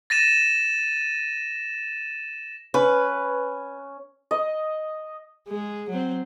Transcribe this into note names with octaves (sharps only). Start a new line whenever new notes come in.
A6 A#6 D#7 E7
C#4 B4
D#5
G#3
F#3 C4